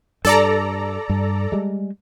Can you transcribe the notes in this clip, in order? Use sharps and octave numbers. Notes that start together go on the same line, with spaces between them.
G2 A4 D5 A#5
G2
G3 G#3